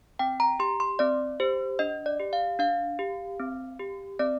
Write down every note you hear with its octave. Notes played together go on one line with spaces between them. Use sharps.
C4 G5
A#5
G4 C6
C6
C4 D5
G4 C5
D4 D#5
D5
G4
F5
D4 F5
G4
C4
G4
C4 D5